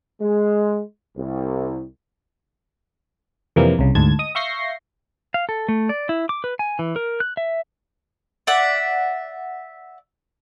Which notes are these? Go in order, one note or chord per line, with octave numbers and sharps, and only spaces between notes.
G#3
C2
F2 C3 E3 G3 A#3
C2 C#3
D2 G#2 A5 G#6
D#5 D#6
E5 F5 C#6 G6 A#6 C7
F5
A4
A3
D5
E4
D6
B4
G#5
E3
A#4
F#6
E5
D5 E5 F#5